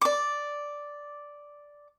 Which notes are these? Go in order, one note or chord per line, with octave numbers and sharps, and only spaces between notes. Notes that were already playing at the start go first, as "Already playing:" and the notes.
D5 D6